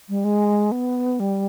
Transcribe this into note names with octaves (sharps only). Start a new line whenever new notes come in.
G3
G#3
B3
G3